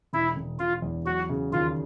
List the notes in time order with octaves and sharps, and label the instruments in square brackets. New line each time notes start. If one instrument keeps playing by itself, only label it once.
[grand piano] E1 [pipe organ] E4
[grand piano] E1
[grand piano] E1 [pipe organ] F4
[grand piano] E2
[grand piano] F#3 [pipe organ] F#4
[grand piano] C#3
[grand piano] D#2 [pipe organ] F4